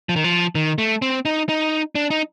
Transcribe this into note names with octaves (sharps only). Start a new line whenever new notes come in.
F3
D#3
F3
D#3
A3
C4
D#4
D#4
D4
D#4